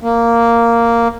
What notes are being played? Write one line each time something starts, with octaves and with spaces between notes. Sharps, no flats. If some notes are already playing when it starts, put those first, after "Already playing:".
A#3